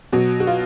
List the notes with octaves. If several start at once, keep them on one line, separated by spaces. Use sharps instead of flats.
B2 F#3 F#4
F#4
F4